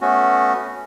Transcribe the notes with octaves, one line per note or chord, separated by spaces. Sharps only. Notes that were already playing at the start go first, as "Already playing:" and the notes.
A3 B3 C#4 F#4